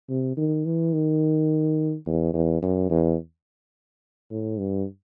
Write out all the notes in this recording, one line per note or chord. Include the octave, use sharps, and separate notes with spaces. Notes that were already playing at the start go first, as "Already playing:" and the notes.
C3
D#3
E3
D#3
E2
E2
F#2
E2
A2
G2